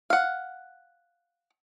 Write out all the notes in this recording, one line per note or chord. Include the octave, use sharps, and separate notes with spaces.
F5 F#5